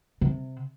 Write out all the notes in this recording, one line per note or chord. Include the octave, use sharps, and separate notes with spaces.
C3